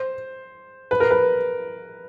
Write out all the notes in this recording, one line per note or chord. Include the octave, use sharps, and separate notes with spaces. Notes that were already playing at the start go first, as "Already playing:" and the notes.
Already playing: C5
B4
A#4
B4